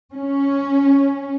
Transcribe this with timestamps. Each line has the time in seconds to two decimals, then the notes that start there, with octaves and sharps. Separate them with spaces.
0.14 C#4